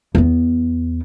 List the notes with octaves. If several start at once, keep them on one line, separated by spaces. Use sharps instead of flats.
E2 B3